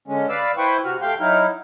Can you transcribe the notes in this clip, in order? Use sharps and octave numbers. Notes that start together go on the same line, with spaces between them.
D3 G#3 C#4
B4 D5 F5 E6
E4 B4 C5 G5 C#6
C3 F#4 F6
A3 G4 F5 G5 C6
F#3 D#4 E4 F6